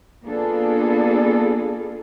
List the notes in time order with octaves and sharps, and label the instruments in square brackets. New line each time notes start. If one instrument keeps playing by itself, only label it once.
[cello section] A#3 B3 D4 F4 G#4 A4